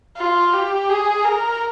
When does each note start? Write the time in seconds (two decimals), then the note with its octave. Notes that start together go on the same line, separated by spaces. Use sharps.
0.17 F4
0.54 G4
0.90 G#4
1.25 A#4